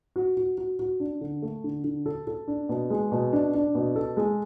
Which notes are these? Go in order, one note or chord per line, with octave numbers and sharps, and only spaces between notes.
F#4
F#4
F#4
F#4
D4
D3
A3
D3
D3
A4
A4
D4
B2
G#3
B2
D4
D4
B2
A4
G#3